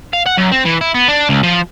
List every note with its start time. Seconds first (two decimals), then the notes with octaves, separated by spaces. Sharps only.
0.13 F5
0.26 F#5
0.37 F#2
0.51 C4
0.65 E3
0.81 E4
0.94 B3
1.08 D4
1.29 C#2
1.43 F3